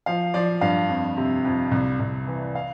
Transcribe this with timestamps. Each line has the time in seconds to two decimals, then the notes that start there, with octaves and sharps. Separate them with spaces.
0.06 F3 F5
0.34 F3 D5
0.61 G2 F5
0.89 F2
1.17 C3
1.45 F2
1.72 C2
2.00 C2
2.27 E3
2.55 F5